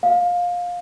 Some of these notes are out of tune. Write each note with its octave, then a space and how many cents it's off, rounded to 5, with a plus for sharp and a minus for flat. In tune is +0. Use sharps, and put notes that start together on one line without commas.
F5 +20